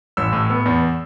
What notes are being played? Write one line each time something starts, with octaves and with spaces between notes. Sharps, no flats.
A1 E6
A2
B3
E2